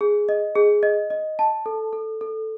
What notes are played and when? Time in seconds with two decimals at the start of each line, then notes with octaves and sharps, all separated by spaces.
0.01 G#4
0.29 D#5
0.56 G#4
0.83 D#5
1.10 D#5
1.39 A5
1.66 A4
1.93 A4
2.21 A4